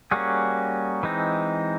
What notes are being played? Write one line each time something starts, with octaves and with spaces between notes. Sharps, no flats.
G3 A#3 C#4 F#4 G#4
E3 G#3 C4 D#4